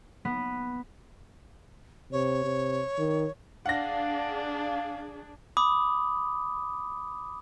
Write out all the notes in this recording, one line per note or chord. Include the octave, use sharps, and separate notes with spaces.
B3
C3 C#5
C3
D#3
D4 G#4 F5 F#5 A#6
B5 D6 D#6